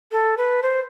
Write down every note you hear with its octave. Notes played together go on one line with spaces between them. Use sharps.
A4
B4
C5